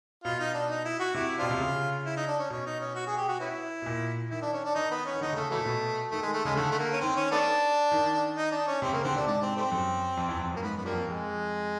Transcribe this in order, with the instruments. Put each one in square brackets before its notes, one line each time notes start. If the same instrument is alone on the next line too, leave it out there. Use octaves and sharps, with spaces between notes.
[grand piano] B2 [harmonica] F4
[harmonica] D#4
D4
D#4
E4
F#4
[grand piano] C3 [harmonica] E4
[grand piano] B2 [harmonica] C4 D4 F4
[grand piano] C3
C#3
[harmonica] E4
D#4
D4
C#4
[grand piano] B2 [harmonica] C#4
[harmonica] D#4
C#4
F#4
G#4
G4
F#4
B3 C#4 E4
[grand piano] B2
A#2
[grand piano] D#3 [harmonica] E4
[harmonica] D4
C#4
D4
[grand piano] D#3 [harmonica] D#4
[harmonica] B3
C#4
[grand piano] D#3
[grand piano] D3 [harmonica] D#4
[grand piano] C#3
[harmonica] A3
[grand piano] A#2 [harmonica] E3 F#3 A3
[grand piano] B2
[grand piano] D#3 [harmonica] A3
[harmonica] G#3
A3
[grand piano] C#3 [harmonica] G#3
[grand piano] D3 [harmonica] A3
[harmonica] A3
A#3
C#4
[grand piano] D#3 [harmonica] C4
[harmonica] C#4
A3 B3 D4
[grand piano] D#3
[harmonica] D#4
D4
C#4
[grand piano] C3 [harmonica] C4
[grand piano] C#3 [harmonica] A#3
[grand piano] D3 [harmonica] C4
[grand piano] C3 [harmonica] D4
[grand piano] G#2 [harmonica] D4
[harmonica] C4
G3 A3 C4
[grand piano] F#2
F2
E2
F2
F#2
[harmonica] A#3
[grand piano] G#2 [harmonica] B3
[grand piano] F#2 [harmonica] B3
[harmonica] F3 G3 A#3
[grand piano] F2
[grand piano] F2 [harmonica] G#3